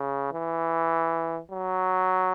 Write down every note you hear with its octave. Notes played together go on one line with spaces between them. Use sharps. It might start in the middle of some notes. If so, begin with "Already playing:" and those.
Already playing: C#3
E3
F#3